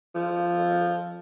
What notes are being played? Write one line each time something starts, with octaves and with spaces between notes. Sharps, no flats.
F3